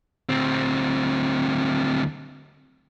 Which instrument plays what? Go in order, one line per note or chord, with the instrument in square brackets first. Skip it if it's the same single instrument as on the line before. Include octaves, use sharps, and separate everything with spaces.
[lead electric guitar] D2 C4